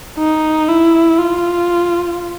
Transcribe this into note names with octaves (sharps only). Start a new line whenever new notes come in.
D#4
E4
F4